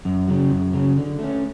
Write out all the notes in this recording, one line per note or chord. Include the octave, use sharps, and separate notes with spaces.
F#2
C#3 F#3
F#2
C#3 F#3
D3
A3 C#4